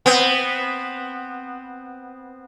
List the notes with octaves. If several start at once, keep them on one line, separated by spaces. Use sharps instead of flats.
B3 C4